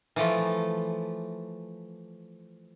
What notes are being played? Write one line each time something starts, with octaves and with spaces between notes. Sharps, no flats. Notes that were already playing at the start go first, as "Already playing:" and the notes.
E3 F3 A3